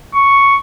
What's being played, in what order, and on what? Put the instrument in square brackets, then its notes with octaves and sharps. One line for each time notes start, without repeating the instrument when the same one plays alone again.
[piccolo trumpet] C#6